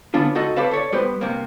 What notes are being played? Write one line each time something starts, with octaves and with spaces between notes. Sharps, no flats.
D3 B3 C#4 D4 F4
C#2 D#4 F#4 A4 D#5
G4 A4 B4 C#5 F5 A5
A4 C#5 D5
G3 B3 G4 B4 C5
G2 C3 A#3